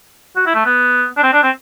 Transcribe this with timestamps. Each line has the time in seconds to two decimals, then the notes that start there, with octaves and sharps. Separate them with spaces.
0.36 F#4
0.46 E4
0.55 A3
0.65 B3
1.17 D4
1.23 C4
1.33 D4
1.43 C4